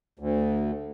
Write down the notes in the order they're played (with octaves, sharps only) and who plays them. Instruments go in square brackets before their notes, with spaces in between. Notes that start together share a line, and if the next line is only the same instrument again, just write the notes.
[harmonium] D2